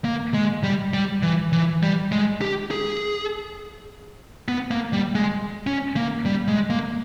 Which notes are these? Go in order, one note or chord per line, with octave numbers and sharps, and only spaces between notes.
A#3
G#3
G3
G3
E3
E3
G3
G#3
G4
G#4
B3
A#3
G3
G#3
C#4
A#3
G3
G#3
A#3